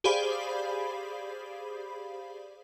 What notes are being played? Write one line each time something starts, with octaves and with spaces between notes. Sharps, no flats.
G4 G#4 C5 D5 F5 B5